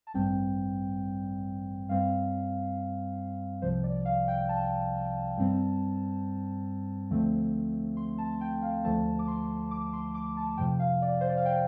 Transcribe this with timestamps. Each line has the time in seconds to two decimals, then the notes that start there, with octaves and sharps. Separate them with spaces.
0.07 A5
0.14 A1 G2 G3 C4 G5
1.89 G2 G3 C4 F5
3.62 C2 C3 F3 C5
3.84 D5
4.05 F5
4.28 G5
4.49 A5
5.37 G2 G3 C4
7.10 D2 D3 F3 A3 C4
7.97 C6
8.18 A5
8.41 G5
8.62 F5
8.84 D2 D3 F3 A3 A5
9.19 D6
9.28 C6
9.71 D6
9.93 C6
10.14 D6
10.37 A5
10.57 F2 C3 F3 G5
10.79 F5
11.02 D5
11.21 C5
11.29 D5
11.37 F5
11.46 G5